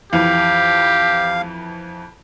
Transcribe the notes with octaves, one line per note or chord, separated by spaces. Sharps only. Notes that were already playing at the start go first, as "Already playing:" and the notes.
F2 E3 G4 F5